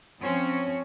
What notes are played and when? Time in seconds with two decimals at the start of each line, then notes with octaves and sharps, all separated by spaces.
0.21 F3 C4 C#4 C#5